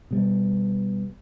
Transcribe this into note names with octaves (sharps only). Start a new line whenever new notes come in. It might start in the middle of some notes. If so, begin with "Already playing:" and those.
B2 G3 B3